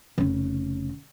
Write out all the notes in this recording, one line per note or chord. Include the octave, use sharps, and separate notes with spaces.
F1 C#3